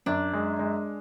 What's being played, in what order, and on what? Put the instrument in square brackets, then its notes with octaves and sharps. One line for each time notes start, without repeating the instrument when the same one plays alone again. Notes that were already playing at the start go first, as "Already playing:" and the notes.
[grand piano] F#2 [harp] D4
[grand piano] G#3
G#3